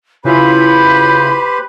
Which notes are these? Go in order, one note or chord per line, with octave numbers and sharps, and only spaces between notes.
C#3 E4 F4 G4 B4 C5 B5